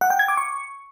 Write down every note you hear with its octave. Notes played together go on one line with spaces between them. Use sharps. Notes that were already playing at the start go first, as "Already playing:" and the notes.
F#5
G5
G#6
D6
C#6